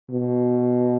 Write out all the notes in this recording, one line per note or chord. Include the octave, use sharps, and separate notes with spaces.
B2